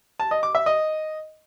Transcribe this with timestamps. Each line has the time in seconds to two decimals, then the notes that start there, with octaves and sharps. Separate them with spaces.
0.20 A5
0.31 D#5
0.43 D6
0.55 E5
0.66 D#5